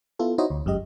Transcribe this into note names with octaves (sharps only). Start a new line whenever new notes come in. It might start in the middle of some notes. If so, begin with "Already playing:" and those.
B3 E4 F4 A4
D#4 E4 F#4 C5 C#5 D#5
D2
G1 F#2 G#3 G4 D#5